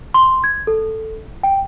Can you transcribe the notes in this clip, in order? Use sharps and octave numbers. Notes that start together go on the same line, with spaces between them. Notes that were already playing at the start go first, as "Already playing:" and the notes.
C6
G#6
A4
G5